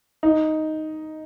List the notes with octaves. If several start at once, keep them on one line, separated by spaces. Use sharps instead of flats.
D#4